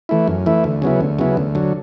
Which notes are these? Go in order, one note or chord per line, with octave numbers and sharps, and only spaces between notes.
E3 A3 E4
F#2
E3 A3 E4
D2
C#3 F#3 B3 E4
D2
C#3 F#3 B3 E4
D2
D3 F#3